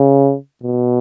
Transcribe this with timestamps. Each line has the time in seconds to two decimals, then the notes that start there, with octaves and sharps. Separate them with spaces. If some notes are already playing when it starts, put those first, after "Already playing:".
Already playing: C#3
0.63 B2